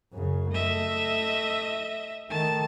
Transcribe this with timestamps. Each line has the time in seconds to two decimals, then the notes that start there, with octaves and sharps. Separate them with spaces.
0.13 F#2 C#3
0.53 A3 D#5 E5
2.30 D#3 A3 A5